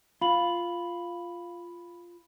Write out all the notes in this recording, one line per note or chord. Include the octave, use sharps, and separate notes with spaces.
F4 B5 F#7